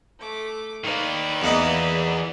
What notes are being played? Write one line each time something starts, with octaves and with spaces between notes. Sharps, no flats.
A3 D6
D#3 A#3 B4 D5
E2 E3 A#3 D#4 F#5